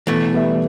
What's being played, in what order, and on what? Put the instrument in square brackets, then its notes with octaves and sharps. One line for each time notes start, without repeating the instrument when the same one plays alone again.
[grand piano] B2 [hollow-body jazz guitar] E3 A3
[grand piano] G3 B3 G4 E5